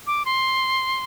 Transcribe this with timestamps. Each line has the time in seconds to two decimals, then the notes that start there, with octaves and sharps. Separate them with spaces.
0.07 D6
0.25 C6